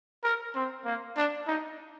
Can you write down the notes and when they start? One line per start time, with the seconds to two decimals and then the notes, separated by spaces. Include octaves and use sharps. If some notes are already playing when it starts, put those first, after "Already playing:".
0.24 A#4
0.55 C4
0.85 A#3
1.16 D4
1.47 D#4